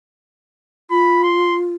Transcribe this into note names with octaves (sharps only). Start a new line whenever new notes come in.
F4 B5
C6